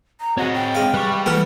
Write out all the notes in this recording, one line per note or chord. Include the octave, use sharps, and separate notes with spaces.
A#5
C4 F#4 G#4 C#5 D#5
G5
G#3 F5
G3 B4 C#6
E3 A#3 F#4 A4 B4 F6